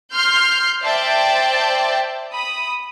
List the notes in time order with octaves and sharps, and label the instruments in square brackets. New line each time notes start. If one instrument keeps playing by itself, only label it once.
[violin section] C6 F6 G6 C7
C5 D5 E5 G5 A5
B5 D#6